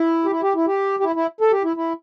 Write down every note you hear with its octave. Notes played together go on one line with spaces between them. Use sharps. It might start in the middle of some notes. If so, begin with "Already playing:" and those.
Already playing: E4
G4
E4
G4
E4
G4
G4
E4
E4
A4
G4
E4
E4